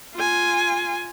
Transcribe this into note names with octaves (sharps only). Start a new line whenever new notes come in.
F4 G#5